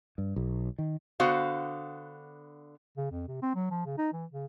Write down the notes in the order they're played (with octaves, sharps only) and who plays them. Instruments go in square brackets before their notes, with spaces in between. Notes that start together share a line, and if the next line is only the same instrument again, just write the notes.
[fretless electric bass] G2
B1
D#3
[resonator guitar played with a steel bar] D3 B3 F#4 C5 F5
[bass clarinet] C#3
F2
C3
C4
F#3
F3
C#3
D#4
E3
C#3